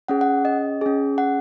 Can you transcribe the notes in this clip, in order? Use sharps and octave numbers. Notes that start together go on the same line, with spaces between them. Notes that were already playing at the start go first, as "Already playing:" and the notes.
C#4 G#4 F#5
F#5
D#5
C#4 G#4
F#5